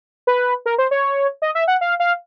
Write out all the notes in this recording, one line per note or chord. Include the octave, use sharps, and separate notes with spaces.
B4
A#4
C5
C#5
D#5
E5
F#5
F5
F5